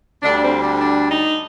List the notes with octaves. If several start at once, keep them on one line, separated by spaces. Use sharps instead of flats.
D2 D3 G3 D4
D4
C4
D4
D4
D#4